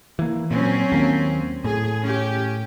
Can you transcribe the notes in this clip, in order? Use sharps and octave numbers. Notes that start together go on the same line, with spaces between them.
E3 A#3
A#2 F#3 C4 C#4
D#2 A#3
A2 G#4
C#4 G4